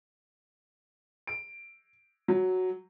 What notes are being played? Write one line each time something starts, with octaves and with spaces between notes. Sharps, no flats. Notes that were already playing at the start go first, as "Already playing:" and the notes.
D7
F#3